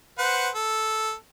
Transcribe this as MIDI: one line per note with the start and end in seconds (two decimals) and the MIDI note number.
0.18 0.49 71
0.18 0.49 72
0.18 0.49 78
0.55 1.13 69